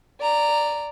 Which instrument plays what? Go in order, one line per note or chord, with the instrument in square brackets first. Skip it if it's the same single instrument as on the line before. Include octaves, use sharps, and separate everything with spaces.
[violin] D5 A#5